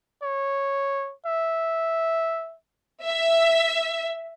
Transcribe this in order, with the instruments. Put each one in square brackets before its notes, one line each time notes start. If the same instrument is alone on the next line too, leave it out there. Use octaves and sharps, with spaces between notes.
[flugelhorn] C#5
E5
[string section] E5